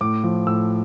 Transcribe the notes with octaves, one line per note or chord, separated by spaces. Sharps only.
A2 D6
F3
A2 E6